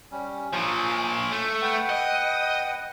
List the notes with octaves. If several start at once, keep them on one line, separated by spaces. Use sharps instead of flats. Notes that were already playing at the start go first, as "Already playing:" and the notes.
G3 C#4
A#2 F3 C#5 G#5
A3
B4 F#5 G5
D#5